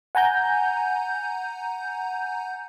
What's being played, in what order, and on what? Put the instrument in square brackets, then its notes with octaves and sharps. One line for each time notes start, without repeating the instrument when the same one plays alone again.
[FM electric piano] F#5 G#5 A#5 G6